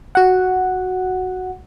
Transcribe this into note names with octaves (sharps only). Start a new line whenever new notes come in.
F#4 F#5